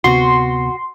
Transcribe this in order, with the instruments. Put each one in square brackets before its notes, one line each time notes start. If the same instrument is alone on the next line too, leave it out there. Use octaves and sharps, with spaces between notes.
[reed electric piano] D2 C3 B3 [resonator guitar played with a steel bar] F#4 [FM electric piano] C6